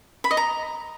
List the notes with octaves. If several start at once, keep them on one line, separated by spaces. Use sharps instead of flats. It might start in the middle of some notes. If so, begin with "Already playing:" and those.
B5
D#5
A#5